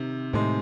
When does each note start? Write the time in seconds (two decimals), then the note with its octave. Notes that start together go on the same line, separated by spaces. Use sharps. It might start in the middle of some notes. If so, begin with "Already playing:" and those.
Already playing: C3 D#3
0.33 A2 C3 D#3 G#3